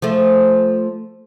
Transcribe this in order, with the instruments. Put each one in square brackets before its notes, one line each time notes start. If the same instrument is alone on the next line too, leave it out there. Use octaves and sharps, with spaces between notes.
[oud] F3 A3